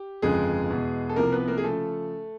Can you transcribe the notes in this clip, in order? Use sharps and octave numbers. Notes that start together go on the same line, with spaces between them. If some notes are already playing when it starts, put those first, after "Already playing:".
Already playing: G4
G1 F2 C#3 F3 G#3 G#4
E2 B2
A4
C2 C3 F3 A#3 A#4
B3 B4
A#3 A#4
G#4
C#3 F3 A3 A4